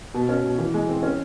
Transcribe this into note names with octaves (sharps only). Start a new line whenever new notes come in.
B2
C#4
B2
E3
G#3
C4
C#4